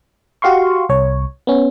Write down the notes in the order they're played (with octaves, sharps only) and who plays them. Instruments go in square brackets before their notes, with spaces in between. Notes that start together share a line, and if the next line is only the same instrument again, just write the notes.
[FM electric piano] F#4 G4 F5 C6 C#6
C2 C#5
B3 C#4